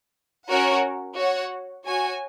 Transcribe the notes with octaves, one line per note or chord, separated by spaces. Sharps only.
C#4 F#4 A#4 C#5 F#5
F#4 C#5 F#5
F#4 C#5 G#5